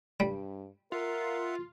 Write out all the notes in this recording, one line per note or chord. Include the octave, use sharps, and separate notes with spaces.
G2 G3
F4 A#4 E5 F#5 C6